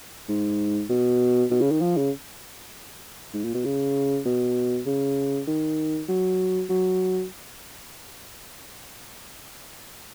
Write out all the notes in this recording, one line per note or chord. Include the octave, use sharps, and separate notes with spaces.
G#2
B2
B2
C#3
D#3
F3
C#3
G#2
A#2
B2
C#3
B2
C#3
D#3
F#3
F#3